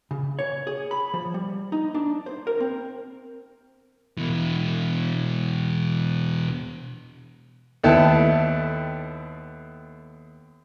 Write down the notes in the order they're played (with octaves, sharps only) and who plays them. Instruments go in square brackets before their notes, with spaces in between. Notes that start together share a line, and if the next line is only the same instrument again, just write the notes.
[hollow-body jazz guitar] C#3
C#5
G#4
B5
F3
G3
D#4
D4
C5
A#4
C4
[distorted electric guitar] B2 E3
[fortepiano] D#2 A3 B3 E4 G5 A5